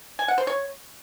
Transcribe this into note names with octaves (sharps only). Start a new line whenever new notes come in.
G#5
F#5
C5
C#5